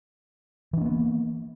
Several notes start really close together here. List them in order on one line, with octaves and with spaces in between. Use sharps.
E3 D4 A#3 B3